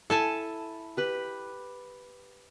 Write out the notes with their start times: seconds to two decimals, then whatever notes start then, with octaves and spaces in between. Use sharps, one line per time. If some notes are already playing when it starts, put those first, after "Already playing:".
0.10 E4 A4 G#5 A5
0.97 G4 B4 B5